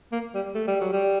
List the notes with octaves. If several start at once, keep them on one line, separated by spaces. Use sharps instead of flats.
A#3
G3
A3
G3
F#3
G3